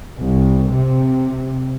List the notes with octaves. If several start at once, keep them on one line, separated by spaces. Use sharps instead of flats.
C2
C3